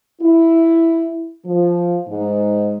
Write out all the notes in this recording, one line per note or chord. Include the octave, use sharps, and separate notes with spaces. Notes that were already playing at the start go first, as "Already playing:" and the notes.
E4
F3
G#2